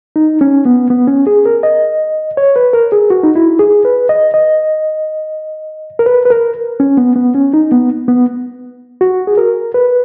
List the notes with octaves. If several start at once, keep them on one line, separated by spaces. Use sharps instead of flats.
D#4
C#4
B3
B3
C#4
G#4
A#4
D#5
C#5
B4
A#4
G#4
F#4
D#4
E4
G#4
B4
D#5
D#5
A#4
B4
B4
A#4
C#4
B3
B3
C#4
D#4
B3
B3
F#4
G#4
A#4
B4